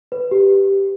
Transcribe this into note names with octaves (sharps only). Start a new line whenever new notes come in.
B4
G4